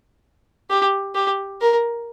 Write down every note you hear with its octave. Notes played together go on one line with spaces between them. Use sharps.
G4
G4
A#4